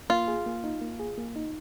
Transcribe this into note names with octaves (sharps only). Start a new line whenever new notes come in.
A#3 F4
G#4
A#3
D#4
A#3
G#4
A#3
D#4